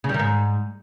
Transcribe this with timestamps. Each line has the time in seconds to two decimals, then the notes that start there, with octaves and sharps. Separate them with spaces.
0.04 C#3
0.09 G3
0.14 D#3
0.19 G#2